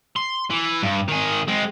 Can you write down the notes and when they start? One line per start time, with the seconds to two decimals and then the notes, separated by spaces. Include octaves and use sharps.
0.16 C6
0.51 E3
0.83 G2
1.08 D#3 G#4
1.48 G#3 C4